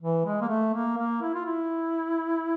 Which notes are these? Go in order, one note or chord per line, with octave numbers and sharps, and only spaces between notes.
E3
G#3
A#3
A3
A#3
A#3
E4
F4
E4